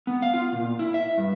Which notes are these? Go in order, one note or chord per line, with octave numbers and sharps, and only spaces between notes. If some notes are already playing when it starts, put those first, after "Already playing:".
B3
F5
F4
A#2
E4
E5
G2